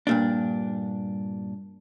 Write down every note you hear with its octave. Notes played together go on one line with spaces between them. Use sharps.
G2 A#2 D4